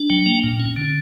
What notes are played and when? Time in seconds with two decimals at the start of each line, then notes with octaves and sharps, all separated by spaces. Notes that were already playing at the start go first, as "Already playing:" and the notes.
Already playing: D4
0.10 F#3 G5
0.26 A#3
0.44 A#2
0.60 C#4
0.77 D3